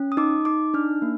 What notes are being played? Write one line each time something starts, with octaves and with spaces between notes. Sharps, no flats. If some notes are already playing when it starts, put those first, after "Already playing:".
Already playing: C#4
D#6
D#4 D6
D#4 D6
D4 F6
A#3